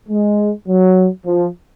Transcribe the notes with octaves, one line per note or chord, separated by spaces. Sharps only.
G#3
F#3
F3